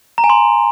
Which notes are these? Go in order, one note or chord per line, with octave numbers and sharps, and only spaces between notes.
A#5
G#5
C6